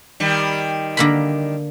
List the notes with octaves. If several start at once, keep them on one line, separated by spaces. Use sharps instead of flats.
D#3 G3
D3 A#3 B5